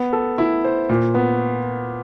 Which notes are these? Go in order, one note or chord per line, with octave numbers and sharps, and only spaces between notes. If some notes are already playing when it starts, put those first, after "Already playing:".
Already playing: B3
A4
E4
C5
A#2
B3